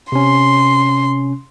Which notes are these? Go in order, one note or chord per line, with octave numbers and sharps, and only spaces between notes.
C3 C#4 C6